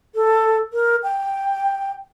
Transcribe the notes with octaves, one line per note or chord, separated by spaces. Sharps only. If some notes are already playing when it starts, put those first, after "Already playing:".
A4
A#4
G5